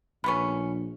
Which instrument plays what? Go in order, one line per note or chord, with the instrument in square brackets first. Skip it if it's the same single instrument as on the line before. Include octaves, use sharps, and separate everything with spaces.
[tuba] A#1 [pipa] A3 B3 C#4 [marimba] B5 C#6